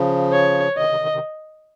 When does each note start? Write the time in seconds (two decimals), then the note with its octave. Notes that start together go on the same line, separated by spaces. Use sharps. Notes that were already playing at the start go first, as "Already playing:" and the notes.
Already playing: C#3 F3
0.32 C#5
0.77 C3 D#3 D#5
0.88 C3 D#3
1.00 C3 D#3
1.11 C3 D#3